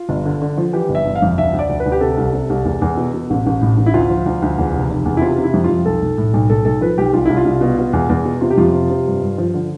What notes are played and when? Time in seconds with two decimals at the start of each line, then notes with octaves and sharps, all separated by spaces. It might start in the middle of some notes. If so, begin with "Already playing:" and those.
Already playing: F4
0.09 G1
0.25 D3
0.42 D3
0.57 F3
0.73 E3 G4
0.89 G1
0.95 E5
1.06 G1
1.15 F5
1.22 F2
1.38 D2 E5
1.53 D2
1.59 D5
1.69 D2
1.80 B4
1.86 D2
1.92 G4
2.01 C3 A4
2.17 C2
2.33 C3
2.50 C2
2.65 E2
2.82 E2
2.97 B2
3.14 B2
3.30 A1
3.46 A1
3.62 A2
3.77 A1
3.86 E4
3.94 D2 F4
4.10 F3
4.26 D2
4.42 D2
4.58 E2
4.73 F1
4.90 F1
5.05 E2
5.17 E4
5.22 C3 F4
5.38 C3
5.43 E4
5.54 F2
5.64 F2 F4
5.85 B1 A4
6.02 B1
6.18 A2
6.33 B1
6.49 B1 A4
6.65 B1 A4
6.81 F3 B4
6.98 B1 G4
7.13 C2 F4
7.25 C2 E4
7.37 F4
7.45 C2
7.61 B2
7.78 B2
7.93 E2
8.09 E2
8.25 B2
8.41 C3 F4
8.51 G4
8.57 F2 F4
8.73 C3
8.90 C3
9.06 G2
9.22 G2
9.38 F3
9.54 D3